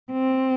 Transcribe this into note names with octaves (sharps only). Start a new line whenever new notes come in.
C4